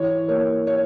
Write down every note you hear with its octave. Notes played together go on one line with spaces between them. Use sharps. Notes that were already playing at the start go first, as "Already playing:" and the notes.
Already playing: E3 C#5
A#3 C#5
C#5